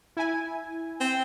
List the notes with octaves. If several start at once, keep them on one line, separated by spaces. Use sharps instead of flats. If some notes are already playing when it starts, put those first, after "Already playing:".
E4 G#5
C4